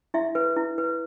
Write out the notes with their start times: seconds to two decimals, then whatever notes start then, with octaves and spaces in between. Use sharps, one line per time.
0.14 E4 E5
0.35 B4
0.56 E4
0.78 B4